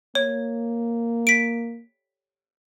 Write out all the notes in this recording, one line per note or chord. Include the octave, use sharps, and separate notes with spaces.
A#3 C#5
B6 D7